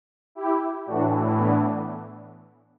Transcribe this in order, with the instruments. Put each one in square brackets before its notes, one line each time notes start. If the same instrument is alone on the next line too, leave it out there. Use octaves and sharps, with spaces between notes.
[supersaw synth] E4 G4
A2 E3 D4 F#4
B3 D4